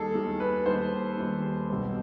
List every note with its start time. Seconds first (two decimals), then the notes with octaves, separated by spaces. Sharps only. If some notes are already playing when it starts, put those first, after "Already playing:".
Already playing: D#2 D#3 G3 G#4 A4
0.15 D#2 D#3 G3
0.40 B4
0.66 D#2 D#3 G3 C5
1.17 D#2 D#3 G3
1.70 B1 B2 G3 C4